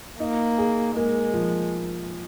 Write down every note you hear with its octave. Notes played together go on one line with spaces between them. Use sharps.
A#3 D#4
G#4
G#3 A#3
F3